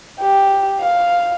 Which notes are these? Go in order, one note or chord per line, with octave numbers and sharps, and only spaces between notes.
G4
F5